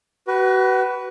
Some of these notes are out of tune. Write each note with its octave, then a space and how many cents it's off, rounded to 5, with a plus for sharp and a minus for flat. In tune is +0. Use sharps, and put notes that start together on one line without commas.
F#4 +35 B4 +0